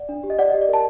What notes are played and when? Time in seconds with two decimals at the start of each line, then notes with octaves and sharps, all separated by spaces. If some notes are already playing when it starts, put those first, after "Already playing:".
Already playing: D5 F#5
0.09 D4
0.23 G4
0.30 D#5
0.39 D5 F#5
0.50 G4 D#5
0.61 D5
0.69 A#4 A5